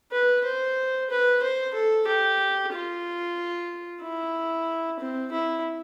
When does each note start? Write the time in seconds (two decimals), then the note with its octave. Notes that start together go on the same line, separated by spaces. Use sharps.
0.12 B4
0.44 C5
1.10 B4
1.42 C5
1.74 A4
2.07 G4
2.73 F4
4.02 E4
4.99 C4
5.32 E4